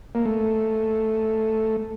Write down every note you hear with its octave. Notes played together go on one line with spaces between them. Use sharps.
A#3
A3